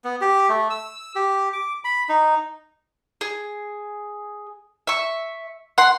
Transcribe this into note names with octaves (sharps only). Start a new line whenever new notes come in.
B3
G4
A3
E6
G4
D6
B5
D#4
G#4
E5 C#6
F#5 C6